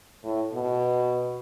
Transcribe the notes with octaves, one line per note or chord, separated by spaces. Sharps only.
A2
B2